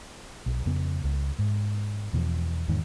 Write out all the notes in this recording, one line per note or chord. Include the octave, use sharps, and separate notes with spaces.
B1
F2 C#3 B3
C#2
G#2
E2 B2 F3
E2 G#2 D#3